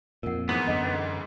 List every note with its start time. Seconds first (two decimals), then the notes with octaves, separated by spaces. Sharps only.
0.23 F2 A#2 A#4 F#5
0.49 G#2 E3 B3 C5 D#6
0.67 F#2 D3 G#4 D#5